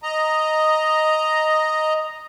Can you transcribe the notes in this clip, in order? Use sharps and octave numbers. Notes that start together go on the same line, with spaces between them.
D#5 A#5